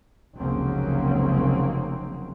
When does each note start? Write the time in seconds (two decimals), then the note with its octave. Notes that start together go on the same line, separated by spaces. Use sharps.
0.38 F1 C#2 C#3 F#3 A#3 C4